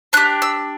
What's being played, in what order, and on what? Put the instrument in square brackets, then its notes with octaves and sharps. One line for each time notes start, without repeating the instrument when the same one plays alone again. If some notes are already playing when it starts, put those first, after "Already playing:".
[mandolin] D4 G4 F#6
E6